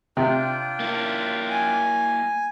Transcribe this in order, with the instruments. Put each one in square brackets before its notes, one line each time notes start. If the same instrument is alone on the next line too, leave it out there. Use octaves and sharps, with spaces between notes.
[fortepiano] C3 [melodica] D4 F4 G5
[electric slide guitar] A#3 E4
[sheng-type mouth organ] G#5